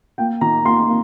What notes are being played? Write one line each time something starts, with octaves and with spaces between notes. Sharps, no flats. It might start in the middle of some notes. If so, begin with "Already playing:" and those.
A#3 G5
D#3 A#5
A#3 C6
A#3